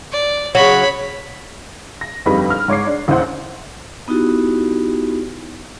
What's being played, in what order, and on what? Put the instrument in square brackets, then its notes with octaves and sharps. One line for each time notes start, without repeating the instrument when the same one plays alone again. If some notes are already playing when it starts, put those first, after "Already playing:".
[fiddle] D5
[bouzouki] C#3 F#3 [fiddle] C#5 B5
[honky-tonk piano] A#6
G1 F2 G3 D#4 B4 B5
F6
G#2 C#5 D6 C7
D4
A1 D#2 E4 C5 F#5
[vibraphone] B3 D#4 E4 F#4 G4